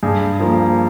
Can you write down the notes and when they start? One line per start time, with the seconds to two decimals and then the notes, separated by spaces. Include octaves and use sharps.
0.03 G2 G#4
0.40 F3 A#3